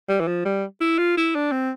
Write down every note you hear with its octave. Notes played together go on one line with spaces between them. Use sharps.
G3
E3
F3
G3
E4
F4
E4
D4
C4